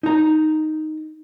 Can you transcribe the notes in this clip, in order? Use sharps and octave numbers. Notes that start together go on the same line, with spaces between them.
D#4 A#5